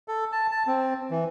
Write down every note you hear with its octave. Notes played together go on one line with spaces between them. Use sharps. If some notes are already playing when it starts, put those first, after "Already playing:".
A4
A5
A5
C4
E3